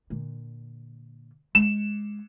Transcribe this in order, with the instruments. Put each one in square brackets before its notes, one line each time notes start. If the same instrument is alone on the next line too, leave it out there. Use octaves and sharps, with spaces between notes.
[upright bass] A#2 D3
[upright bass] G#3 D4 [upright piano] E7